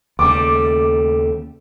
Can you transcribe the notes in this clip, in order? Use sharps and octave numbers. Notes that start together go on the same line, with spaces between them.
D#2 C#3 G3 A3 D6